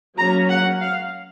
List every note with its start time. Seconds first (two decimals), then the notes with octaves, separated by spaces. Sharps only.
0.17 F#3 A#3 C#4 A#5
0.49 F#5
0.80 F5